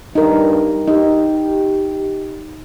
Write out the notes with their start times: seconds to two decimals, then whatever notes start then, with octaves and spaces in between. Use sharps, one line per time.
0.15 G2 D#4 A#4
0.88 D#4 G4